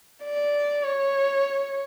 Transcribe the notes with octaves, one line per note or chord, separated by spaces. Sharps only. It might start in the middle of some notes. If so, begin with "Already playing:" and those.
D5
C#5